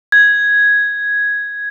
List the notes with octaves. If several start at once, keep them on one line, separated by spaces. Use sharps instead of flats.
G#6